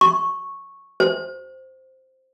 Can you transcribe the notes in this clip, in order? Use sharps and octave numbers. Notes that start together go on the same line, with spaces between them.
C#6
C5